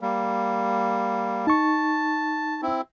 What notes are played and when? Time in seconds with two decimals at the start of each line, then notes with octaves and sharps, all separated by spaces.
0.01 G3 A#3
1.47 D#4 A5 C#6
2.62 C4 E4